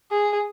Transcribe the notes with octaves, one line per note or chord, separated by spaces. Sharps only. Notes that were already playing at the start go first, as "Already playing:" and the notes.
G#4